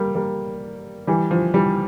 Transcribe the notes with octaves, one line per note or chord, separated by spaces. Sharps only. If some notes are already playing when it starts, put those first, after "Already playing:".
Already playing: G3 A#3
G3 A#3
E3 G3
F3
E3 G3